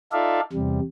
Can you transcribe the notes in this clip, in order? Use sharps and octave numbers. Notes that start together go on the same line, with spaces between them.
D#4 F4 A4 D5 E5 F5
E2 C3 G3